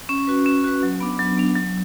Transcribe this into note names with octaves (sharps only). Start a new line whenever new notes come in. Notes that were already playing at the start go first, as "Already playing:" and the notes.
C#4
F#4 B4
C#4
F#4 B4
F#3
B3 D4
F#3
B3 D4
F#3